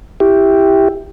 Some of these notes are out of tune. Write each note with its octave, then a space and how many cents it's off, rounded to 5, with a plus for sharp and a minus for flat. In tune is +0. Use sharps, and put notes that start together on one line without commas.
E4 +0 G4 +5